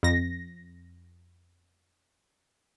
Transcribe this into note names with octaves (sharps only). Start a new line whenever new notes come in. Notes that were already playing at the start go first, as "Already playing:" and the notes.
F2 A#6